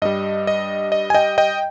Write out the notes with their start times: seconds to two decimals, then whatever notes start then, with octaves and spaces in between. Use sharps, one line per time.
0.02 G2 G3 D#5
0.47 D#5
0.92 D#5
1.10 G#5
1.14 D#5 G5
1.38 D#5 G5